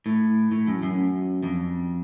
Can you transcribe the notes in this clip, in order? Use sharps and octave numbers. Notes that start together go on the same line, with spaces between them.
A2
A2
F#2
F#2
F2